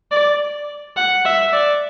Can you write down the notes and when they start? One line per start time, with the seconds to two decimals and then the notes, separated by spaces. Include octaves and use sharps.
0.12 D5
0.96 F#5
1.25 E5
1.53 D5